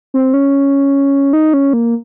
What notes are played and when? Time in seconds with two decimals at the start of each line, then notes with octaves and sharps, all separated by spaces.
0.14 C4
0.34 C#4
1.33 D#4
1.54 C#4
1.73 A#3